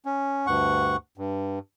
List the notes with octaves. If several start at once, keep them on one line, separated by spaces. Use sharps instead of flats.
C#4
D2 G2 F#5 C#6
G2